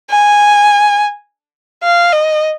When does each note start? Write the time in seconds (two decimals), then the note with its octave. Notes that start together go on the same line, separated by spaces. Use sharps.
0.11 G#5
1.84 F5
2.13 D#5